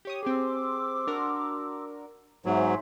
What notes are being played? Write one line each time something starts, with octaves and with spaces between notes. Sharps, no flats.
G4 C#5 D#6
C4 G4 G#4 C6 D6 E6
D4 F#4 A#4
G#2 F#3 B3 C5 E5 G#5